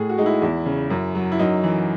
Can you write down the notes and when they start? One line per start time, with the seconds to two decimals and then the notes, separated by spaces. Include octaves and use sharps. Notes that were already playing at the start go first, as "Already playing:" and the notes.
Already playing: A2 G#4
0.09 F#4
0.18 G#3 D#4
0.26 E4
0.42 E2
0.66 C#3
0.90 F#2
1.15 F#3
1.32 E4
1.39 F#2 D#4
1.64 E3